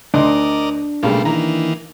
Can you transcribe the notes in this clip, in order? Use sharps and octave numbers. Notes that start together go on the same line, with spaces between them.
D2 D4 D#4 A#4 D5 D#5 C6
B1 C#3 G3 A3 A#3 F4
D#3 E3 A#3 A#5